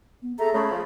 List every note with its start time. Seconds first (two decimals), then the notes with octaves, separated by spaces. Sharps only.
0.22 B3
0.39 A3 G#4 A4 A#5
0.54 C#3 A3 B5
0.71 F3